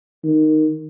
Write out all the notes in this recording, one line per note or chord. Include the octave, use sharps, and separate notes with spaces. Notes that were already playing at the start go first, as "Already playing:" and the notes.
D#3